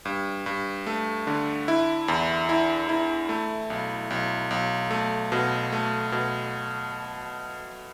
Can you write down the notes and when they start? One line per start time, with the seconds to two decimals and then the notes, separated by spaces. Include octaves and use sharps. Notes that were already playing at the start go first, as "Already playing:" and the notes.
0.05 G2
0.46 G2
0.87 A3
1.27 D3
1.68 E4
2.08 E2
2.49 E4
2.89 E4
3.29 A3
3.70 B1
4.10 B1
4.51 B1
4.91 A3
5.32 B2
5.72 A3
6.12 B2